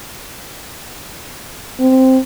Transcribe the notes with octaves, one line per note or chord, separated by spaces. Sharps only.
C4